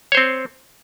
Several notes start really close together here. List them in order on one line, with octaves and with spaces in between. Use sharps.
C#5 C5 C4